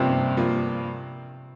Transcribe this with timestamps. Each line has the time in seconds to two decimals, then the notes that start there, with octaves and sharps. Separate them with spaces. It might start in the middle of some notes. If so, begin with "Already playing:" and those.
Already playing: G2 C3 F3 A#3 C4 F4
0.37 G2 F3 A#3 F4